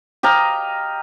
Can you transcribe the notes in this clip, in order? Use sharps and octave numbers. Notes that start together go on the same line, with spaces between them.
G4 D#5 F5 A#5